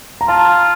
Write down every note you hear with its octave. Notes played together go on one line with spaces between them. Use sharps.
A#5
F4 A5